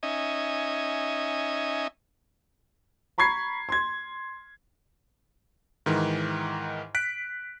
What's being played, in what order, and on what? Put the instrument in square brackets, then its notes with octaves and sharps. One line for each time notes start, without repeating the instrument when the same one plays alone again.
[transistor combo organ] C#4 D#4 D#5 E5 G#5
[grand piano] A#5 B5 C#6 G#6 C7
C6 G#6
[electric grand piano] G#2 D#3 E3
F#6 B6 D7